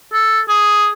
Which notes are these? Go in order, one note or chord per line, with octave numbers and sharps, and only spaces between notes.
A4
G#4